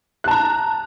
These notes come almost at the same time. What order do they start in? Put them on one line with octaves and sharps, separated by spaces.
F#6 A5 A#5